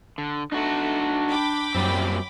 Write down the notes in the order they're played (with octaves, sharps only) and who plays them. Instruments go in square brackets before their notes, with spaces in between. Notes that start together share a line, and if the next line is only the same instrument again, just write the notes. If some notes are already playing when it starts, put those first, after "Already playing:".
[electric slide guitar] D3
[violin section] A3 [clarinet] D4 [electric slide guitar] D#4 F#4
[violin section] G5 B5 D6
[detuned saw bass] F#2 [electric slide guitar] A#2 G3 C4